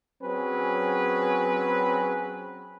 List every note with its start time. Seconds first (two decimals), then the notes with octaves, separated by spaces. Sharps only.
0.22 F#3 C4 C#4 G#4 B4